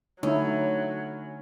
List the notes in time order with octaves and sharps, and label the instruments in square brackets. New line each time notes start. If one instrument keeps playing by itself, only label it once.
[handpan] D3 A3 [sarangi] F#3 [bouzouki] C#4 [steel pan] D#4 E4